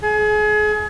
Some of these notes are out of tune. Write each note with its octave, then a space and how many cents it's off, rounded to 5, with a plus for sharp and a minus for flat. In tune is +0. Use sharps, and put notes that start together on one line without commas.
G#4 +35